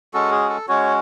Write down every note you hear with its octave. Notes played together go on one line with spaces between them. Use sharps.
G#3 C#4 F#4 A4
G#4
A4
G#3 C#4 F#4 C#5